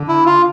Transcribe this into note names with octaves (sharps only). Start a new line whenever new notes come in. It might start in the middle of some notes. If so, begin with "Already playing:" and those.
Already playing: D3
E4
F4